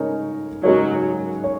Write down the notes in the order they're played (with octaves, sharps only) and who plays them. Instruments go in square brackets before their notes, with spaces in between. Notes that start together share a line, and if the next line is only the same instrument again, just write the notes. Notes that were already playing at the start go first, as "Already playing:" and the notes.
Already playing: [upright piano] C#3 G#3 D#4 A#4 C#5
[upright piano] C#3 G#3 D#4 A#4 C#5 [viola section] F#3
[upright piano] C#5